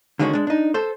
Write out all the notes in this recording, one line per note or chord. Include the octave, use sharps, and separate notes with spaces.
D3 D#3 G#3 C#4 F4 F#4
G#3 D4
D4 D#4
A4 C5